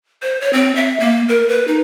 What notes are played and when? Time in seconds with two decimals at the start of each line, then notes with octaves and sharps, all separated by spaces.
0.22 C5
0.41 C#5
0.53 C4
0.76 E5
1.00 A#3
1.29 A#4
1.49 B4
1.68 D#4